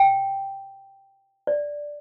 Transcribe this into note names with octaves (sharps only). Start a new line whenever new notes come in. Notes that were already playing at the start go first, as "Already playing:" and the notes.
Already playing: G5
D5